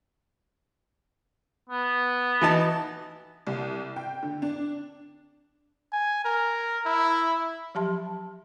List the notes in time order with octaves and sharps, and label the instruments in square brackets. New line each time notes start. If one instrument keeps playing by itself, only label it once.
[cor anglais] B3
[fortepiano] E3 D#4 A5
[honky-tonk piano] C2
G5
D3
D4
[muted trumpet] G#5
A#4
E4
[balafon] F3 F#3 G4 A5 C6